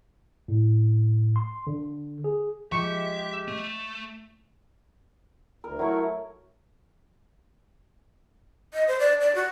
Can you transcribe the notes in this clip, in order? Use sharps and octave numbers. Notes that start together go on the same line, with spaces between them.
A2
C6
D3
G#4
F3 G#3 G4 E5 C#6
A3
D2 A#4
F#3 A3 E4 A#4 C#5
D#5
C5
D5
D5
F#4